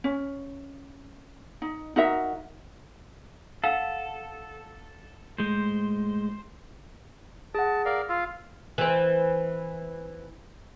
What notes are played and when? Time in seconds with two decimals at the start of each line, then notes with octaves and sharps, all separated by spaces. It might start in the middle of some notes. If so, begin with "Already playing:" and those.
0.04 C#4
1.62 D#4
1.96 D#4 F#4 A#4 E5
3.64 A4 F5 F#5
5.38 A2 G#3 C5
7.55 G#4 F#5 A5
7.86 A#4 D5 F5
8.09 F4 F5 E6
8.78 E3 C4